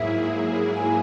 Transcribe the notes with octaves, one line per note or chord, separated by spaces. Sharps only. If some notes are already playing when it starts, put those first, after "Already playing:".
Already playing: G#2 F#3 A#3 E4 G#4 E5
G#5